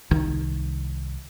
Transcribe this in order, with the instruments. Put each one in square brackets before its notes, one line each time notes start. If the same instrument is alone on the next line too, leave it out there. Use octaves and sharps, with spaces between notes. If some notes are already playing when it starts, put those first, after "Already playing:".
[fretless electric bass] C2 D#3